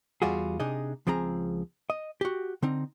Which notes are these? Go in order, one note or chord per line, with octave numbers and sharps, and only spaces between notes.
E2 G3 F4 F#4 G#4
C3 D4 D#4 G#4 D#5
C#2 F3 C4 G#4 A#5
D#5
F#4 G4
D3 C4 D#4